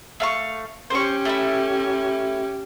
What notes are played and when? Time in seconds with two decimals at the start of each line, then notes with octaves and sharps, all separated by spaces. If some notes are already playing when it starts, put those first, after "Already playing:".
0.20 A3 F5 C#6
0.90 C#4 G4 C5 C#6
1.25 A3 D#4 E4